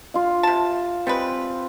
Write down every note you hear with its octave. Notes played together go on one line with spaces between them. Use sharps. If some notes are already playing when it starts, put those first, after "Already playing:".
F4 F5
C3 A5
G3 G#3 C4 B4